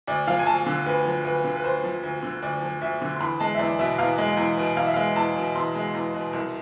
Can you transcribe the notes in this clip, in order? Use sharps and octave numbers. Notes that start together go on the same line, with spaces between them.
D2 D5
F3 F5
G#5
D2 A5
D3
D2 B4
F3
D2 B4
D3
B4
D2 C5
F3
D2
D3
D2 D5
F3
D2 E5
D3
C6
E2 B5
G#3 A5
E5
E2 D5
B2 E5
E2 F5
G#3
E2
B2
E2 F5
E5
G#3 F5
E2 A5
B2
E2 C6
G#3
E2
B2
C2